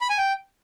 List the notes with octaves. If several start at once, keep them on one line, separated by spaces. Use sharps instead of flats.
B5
G#5
G5